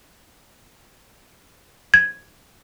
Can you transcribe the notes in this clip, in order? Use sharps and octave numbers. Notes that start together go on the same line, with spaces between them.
G#6